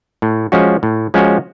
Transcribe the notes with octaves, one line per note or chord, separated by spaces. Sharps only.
A2
F3 G#3 C#4 F#4
A2
F3 G#3 C#4 F#4